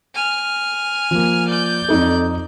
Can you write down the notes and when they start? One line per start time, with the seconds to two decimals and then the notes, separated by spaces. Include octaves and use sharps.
0.15 G#5 F6
1.11 F3 A#3
1.48 D5 G6
1.88 F2 D#4 A4